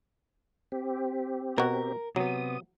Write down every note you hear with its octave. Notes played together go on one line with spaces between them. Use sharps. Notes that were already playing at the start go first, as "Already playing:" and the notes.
C4 G4
B2 F#4 A#4
C3 F#3 B3 D#6